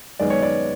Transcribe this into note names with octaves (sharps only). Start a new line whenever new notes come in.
F#2 D#3 G#3 B3 D5
C#5
D5